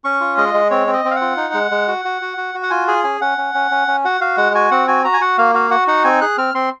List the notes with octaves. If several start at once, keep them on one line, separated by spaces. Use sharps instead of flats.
C#4 C#6
F4
G#3 D#5
G#3
C4 C#5
C4
D#5
C4
F5
F#5
F4
D#4
G#3
G#3
F#4
F#4
F#4
F#4
F#4
F#5
F4 G#5
G#4 G#5
C#4 G#5
C#4 F#5
C#4
C#4
C#4
C#4
F#4 F#5
F#4 F5
G#3 F#5
F#4 G#5
C4 F#5
F#4 G#5
F#4 A#5
G#5
F#4 F#5
A#3 F5
F#4 F5
F#4 F#5
D#4 F#5
C4 G#5
G#4 F#6
C4 F6
C4 C6